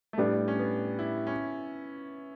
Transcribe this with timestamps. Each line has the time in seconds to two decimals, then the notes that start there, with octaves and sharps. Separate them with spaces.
0.13 A3
0.18 A2 G3 B3 D4
0.48 C#4
0.59 B3
0.99 E4
1.27 C#4